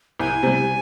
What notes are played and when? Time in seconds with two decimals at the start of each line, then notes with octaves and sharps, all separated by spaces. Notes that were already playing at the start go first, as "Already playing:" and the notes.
0.19 C2 G#5
0.43 C3 G3